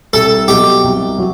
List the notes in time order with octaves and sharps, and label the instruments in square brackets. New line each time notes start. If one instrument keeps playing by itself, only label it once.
[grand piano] C2 [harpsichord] A4
[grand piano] B2 F#3 [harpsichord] G4
[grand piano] C2
F#3